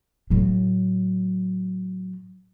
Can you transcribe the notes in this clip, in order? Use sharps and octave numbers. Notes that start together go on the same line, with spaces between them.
A2 F#3